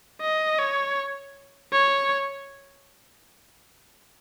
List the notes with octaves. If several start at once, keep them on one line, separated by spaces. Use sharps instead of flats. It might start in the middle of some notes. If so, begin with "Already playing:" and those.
D#5
C#5
C#5